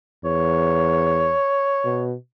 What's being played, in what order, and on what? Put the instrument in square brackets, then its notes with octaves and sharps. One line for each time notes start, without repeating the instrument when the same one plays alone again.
[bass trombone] E2 [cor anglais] C#5
[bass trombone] B2